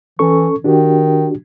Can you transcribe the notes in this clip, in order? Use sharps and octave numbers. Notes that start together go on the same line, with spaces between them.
E3 C#4 A4 C#6
D#3 D4 F#4 G4